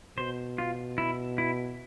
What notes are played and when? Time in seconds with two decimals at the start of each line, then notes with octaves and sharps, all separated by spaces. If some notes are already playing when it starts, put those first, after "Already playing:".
0.18 B2 C5
0.58 F4
0.98 E4
1.38 E4